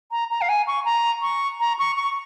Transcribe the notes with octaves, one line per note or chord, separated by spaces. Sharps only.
A#5
A#5
F5
G#5
C#6
A#5
C#6
A#5
C#6
C#6